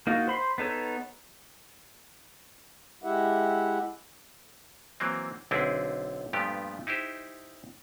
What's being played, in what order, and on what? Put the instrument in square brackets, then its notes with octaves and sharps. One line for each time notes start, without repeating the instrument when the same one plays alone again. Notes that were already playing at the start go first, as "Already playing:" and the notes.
[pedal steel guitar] A#3 D#4 F4 F#4
C5 B5 C6
B3 D#4 A4 C#5
[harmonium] G#3 E4 G4 E5 F#5
[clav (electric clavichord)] E3 F#3 A#3 C4
B1 D3 C4 E4 G#4
G2 A#2 F3 A3 B3 G4
D#4 E4 G4 C5